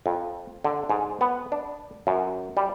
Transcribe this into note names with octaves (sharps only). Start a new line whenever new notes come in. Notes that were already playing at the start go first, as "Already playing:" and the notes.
F2
D3
G#2
B3
D4
F#2
G3